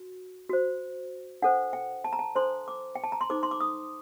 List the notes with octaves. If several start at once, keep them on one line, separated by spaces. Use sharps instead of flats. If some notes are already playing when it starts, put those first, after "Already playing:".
Already playing: F#4
F#4 C5
D4 A4 C5 F#5
G5
A5
A#5
A5
D4 A4 C5 C6
D6
G5
A5
A#5
C6
D#4 A4 C5 D6
C6
D6
D#6